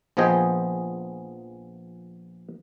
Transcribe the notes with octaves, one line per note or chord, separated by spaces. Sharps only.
A#1 F3 B3 G#4 D#5 G5